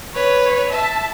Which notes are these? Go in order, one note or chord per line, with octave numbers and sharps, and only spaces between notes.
B4 C#5
E5 A5